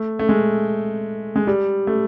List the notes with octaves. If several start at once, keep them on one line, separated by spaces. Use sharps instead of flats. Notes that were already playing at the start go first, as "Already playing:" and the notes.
Already playing: A3
A3
G#3
G#3
G3
A3